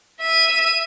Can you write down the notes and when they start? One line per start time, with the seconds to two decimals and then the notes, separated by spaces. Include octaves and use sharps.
0.20 E5 D#7